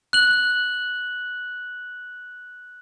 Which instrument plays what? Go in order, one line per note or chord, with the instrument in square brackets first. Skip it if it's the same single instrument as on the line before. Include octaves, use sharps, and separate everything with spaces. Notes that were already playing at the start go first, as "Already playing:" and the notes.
[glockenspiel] F#6 F#7